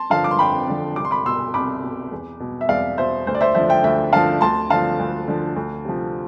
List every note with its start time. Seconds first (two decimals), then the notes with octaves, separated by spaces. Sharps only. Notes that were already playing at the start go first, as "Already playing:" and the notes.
Already playing: A5 C6
0.10 D3 F3 F5 A5
0.24 D6
0.31 C6
0.39 F2 G5 B5
0.68 D3 F3
0.96 C2 D6
1.05 C6
1.11 B5 D6
1.25 B2 C6 E6
1.54 C2 B5 D6
1.82 B2
2.12 E2
2.40 B2
2.61 E5
2.68 E2 D5 F5
2.98 B2 C5 E5
3.27 D2 C5
3.35 D5
3.41 C5 E5
3.55 D3 F3 C5 E5
3.69 E5 G5
3.84 D2 E5 G5
4.13 D3 F3 F5 A5
4.41 D2 A5 C6
4.70 D3 F3 F5 A5
4.99 D2
5.28 D3 F3
5.56 D2
5.85 C3 F3